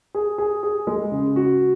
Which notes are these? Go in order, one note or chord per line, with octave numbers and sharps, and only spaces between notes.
G#4
G#4
G#4
G#3
C#3
F#4